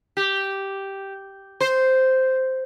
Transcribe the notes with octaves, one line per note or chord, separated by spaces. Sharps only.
G4
C5